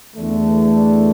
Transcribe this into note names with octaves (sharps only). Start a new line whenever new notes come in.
E2 D3 A3